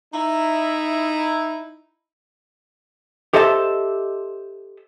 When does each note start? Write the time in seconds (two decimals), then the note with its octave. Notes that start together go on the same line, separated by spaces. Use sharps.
0.14 D#4 E4
3.33 G4 A4 C5 D#5 E5 A5